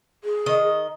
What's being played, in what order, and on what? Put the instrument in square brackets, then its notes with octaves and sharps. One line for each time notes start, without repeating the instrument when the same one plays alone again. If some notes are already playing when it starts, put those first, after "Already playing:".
[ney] G#4
[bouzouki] D#3 D#5